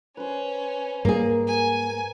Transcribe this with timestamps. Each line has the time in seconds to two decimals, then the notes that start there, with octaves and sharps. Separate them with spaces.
0.17 C#4 B4 C5
1.05 G#2 G3 A#3 G#4 A#4
1.48 G#5